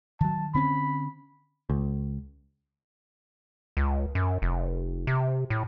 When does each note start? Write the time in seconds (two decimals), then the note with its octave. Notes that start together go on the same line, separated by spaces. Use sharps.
0.21 D#3 F#3 A5
0.54 D3 C4 C#4 B5
1.70 C#2
3.77 C#2
4.15 F#2
4.42 F1
5.07 C3
5.50 A2